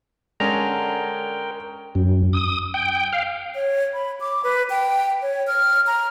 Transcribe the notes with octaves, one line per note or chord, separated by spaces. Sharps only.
D3 G#3 C#4 A#4 G5 A#5
F#2
D#6
G5
F5
C#5
B5
D6
B4
G5
C#5
F6
A#5